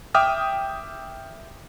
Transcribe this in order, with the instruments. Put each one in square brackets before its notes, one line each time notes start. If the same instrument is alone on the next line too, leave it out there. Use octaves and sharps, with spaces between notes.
[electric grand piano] E5 G5 D6 D#6 F6